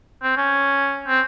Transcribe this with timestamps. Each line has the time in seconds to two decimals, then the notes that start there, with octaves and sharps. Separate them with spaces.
0.23 C4
0.37 C#4
1.08 C4